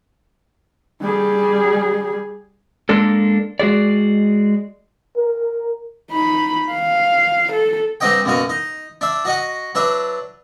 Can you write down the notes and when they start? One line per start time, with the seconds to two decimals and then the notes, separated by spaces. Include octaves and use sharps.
1.02 G3 G#4
2.89 G#3 A#3 D4 A4
3.60 G#3 F#4 G#4 D5
5.17 A#4
6.12 D#4 B5
6.72 F5
7.53 A4
8.00 G2 C4 D#4 F#4 D#5 G5
8.25 F#2 B2 A#3 F#4 D#6
8.49 D#4
9.01 D4 E5
9.25 F#4 D#5 F#5
9.75 F#3 D4 B4 E5